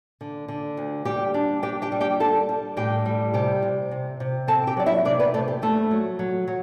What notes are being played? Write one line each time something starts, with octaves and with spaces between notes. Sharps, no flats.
D3
D3
D2
G3 G4 G5
D4
D4 G4 G5
G4 G5
G3
G4 G5
G3 A4 A5
G3
A2 G4 G5
G3
C3 G4 G5
C3
C3
C3
C4 A4 A5
G4 G5
F#3 D5
E4 E5
C3 D4 D5
B3 B4
C3 A3 A4
G4
G2 A3 A4
F#3
F#3
F#3